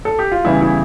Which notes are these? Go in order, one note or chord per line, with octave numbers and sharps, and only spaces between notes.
A4
G4
F4
E2 C#3 E3 G3 E4
E4